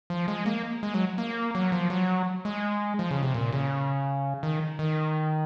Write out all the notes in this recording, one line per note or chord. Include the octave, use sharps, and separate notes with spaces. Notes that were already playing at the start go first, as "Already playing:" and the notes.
F3
G#3
A#3
G#3
F#3
A#3
F#3
F3
F#3
G#3
F3
C#3
C3
A#2
C#3
D#3
D#3